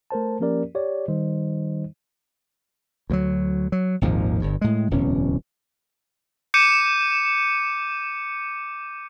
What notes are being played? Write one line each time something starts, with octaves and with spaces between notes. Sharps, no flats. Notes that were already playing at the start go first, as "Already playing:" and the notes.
A3 A#4 C5 A5
F3 A#3 C#4 G4 A#4 D5
G4 C#5 D5
D#3 G3 D#4 C5 D#5
D2 F3 F#3
F#3
G#1 D#2 A#2 F3
G1 G2
A2 G#3
D1 E2 B2 C#4
D6 G6 C#7 D#7 E7